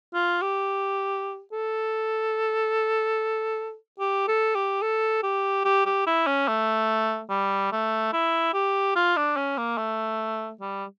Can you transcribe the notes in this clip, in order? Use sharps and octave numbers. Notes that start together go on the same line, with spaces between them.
F4
G4
A4
G4
A4
G4
A4
G4
G4
G4
E4
C#4
A3
G3
A3
E4
G4
F4
D4
C#4
A#3
A3
G3